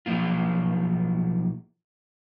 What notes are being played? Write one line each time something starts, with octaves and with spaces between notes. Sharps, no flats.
B1 F#2 F3 A#3 F4